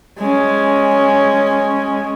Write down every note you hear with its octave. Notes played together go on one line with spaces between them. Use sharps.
G#3 C#4